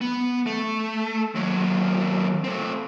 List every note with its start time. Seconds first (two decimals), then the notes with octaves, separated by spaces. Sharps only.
0.01 B3
0.46 A3
1.35 D#2 F#3
2.44 A3 C4